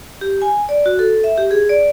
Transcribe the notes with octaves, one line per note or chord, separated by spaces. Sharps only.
G4
G#5
D5
F#4
A4
E5
G4
G#4
D5